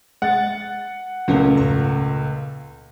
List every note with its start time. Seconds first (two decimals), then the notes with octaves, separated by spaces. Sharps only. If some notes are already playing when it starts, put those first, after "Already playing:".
0.22 G#3 F#5 A6
1.28 C#2 A#2 F#3 A3 C#4 A#4
1.57 E2 G#2 A#5